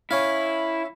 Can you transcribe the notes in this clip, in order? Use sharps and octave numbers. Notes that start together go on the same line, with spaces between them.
C#4 E4 C#5 F5